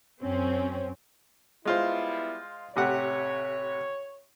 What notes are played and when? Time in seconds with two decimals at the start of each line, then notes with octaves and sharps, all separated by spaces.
0.21 F#2 C4 C#4
1.65 G3 G#3 B3 E4 F4 C5
2.76 A1 C3 C#5 F#5